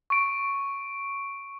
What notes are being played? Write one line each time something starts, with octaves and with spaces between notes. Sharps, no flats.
C#6 D7